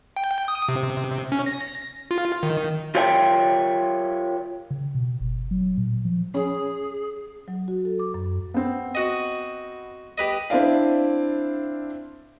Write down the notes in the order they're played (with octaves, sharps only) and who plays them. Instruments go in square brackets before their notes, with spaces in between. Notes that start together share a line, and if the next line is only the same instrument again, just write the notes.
[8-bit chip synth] G5
D#6
C3
C#4
A#6
F4
D#3
[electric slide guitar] F4 G4 A#4 C#5 E5 G5
[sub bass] C#3
B2
G1
F#3
A#2
F3
[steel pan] C#4 [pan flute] G#4
[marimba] F#3
F#4
A4
D6
F#2
[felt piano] B3 C4
[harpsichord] F#4 D#5
G4 B4 D#5
[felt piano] C4 D4 E4 D5 F5